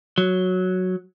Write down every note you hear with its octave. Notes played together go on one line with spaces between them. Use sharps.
F#3